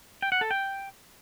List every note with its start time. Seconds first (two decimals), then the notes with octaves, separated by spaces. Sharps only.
0.22 G5
0.32 F#5
0.41 A4
0.51 G5